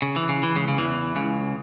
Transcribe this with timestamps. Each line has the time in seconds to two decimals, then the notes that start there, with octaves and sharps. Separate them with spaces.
0.02 C#3
0.16 E3
0.29 C#3
0.43 E3
0.56 C#2 C#3
0.68 C#3
0.77 E2 E3
1.15 C#2 C#3